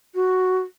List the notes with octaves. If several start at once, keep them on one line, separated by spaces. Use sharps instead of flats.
F#4